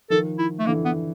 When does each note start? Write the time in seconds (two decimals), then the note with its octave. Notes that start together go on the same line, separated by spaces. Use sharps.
0.10 D#3 F3 A4
0.38 E4
0.59 A3
0.66 D3 E3 A#3
0.85 B3